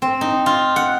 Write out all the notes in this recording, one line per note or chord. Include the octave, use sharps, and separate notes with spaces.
C4
D#4
F4
F#5